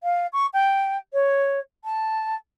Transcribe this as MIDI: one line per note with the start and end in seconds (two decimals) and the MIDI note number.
0.03 0.26 77
0.32 0.46 85
0.53 0.97 79
1.13 1.59 73
1.84 2.35 81